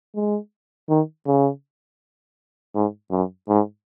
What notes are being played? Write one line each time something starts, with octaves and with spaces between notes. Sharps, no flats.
G#3
D#3
C#3
G#2
F#2
G#2